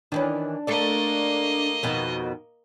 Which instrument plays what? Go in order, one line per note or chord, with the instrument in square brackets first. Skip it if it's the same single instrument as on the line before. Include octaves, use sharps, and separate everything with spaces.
[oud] D#3 E3 C#4 [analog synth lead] D4
[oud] A3 A4 D5 [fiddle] A#3 D#5
[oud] F2 B2 D#3